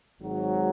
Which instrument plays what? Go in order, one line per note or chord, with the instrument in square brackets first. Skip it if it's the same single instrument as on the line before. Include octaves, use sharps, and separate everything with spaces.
[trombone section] G#1 G#2 F#3